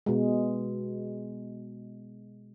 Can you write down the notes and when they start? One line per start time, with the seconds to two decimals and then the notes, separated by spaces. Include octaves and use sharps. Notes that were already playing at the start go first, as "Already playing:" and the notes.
0.06 B2 G#3